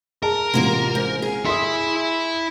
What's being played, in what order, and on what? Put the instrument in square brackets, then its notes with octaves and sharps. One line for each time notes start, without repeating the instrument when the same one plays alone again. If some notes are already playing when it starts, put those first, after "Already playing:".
[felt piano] G#4 A5 [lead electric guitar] A#4
[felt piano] A1 C3 [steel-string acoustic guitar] G#3 A#3 F4
[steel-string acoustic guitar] G#2
G#4
[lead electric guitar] E4 E5 [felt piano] C6 D#6